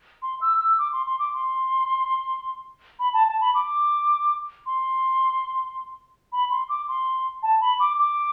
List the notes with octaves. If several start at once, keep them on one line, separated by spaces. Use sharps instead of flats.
C6
E6
E6
D6
C6
C6
D6
C6
B5
A5
A5
B5
D6
C6
B5
C6
D6
C6
A5
B5
D6
D6